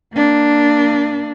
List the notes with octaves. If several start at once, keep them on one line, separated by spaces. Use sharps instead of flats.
A#3 D4